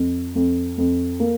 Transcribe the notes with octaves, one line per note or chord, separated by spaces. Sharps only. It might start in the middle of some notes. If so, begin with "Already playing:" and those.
Already playing: F2
F2
F2
A#3